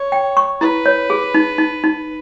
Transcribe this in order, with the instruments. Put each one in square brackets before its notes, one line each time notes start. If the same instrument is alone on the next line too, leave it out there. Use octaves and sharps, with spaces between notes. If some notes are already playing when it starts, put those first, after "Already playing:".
Already playing: [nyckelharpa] C#5
[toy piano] G5
C#6
[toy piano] E4 [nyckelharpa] B4
[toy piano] C#5
G#4
D#4
D#4
D#4